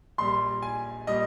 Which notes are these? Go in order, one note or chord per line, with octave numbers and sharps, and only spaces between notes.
A#1 A#2 G3 C6
G#5
A#2 G3 D#5